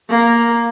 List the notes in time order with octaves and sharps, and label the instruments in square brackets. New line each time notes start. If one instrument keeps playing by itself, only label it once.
[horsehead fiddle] A#3